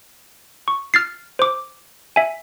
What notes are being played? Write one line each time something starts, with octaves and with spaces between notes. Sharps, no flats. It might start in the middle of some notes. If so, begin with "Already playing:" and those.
C#6
F6 A6 C7
C5 D6
E5 G#5